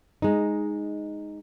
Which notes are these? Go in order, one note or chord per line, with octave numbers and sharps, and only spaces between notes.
G#3 D#4